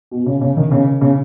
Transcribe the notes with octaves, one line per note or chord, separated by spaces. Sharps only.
B2
C#3
C#3
D#3
C#3
C#3